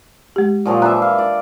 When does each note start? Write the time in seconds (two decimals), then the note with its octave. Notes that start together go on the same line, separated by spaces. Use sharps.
0.36 G#3 G4
0.65 A#2 F3 F#3
0.82 E3 D4 E5 A#5 F#6
1.02 F5
1.18 D5